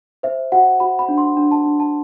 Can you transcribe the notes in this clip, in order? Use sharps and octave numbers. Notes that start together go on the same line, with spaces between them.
C5 E5
F#4 F#5
F#4 B5
B5
D4
C6
D4
A5
D4
A5